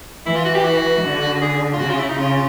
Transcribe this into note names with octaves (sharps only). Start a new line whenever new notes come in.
E3 E4
F4
F#4
G4
F#4
D3
G#4
F4
C#3 F#4
F4
E4
D#4
C#3 F4